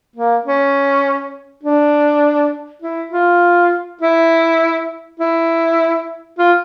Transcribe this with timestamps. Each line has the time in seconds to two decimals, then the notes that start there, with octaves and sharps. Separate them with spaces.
0.16 A#3
0.45 C#4
1.64 D4
2.82 E4
3.12 F4
4.01 E4
5.20 E4
6.38 F4